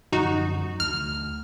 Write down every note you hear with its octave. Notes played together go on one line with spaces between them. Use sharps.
F#2 D3 F3 D#4 F#4
D2 F6